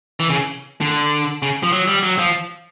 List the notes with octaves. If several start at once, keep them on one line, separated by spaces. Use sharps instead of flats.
E3
C#3
D3
C#3
F3
F#3
G3
F#3
F3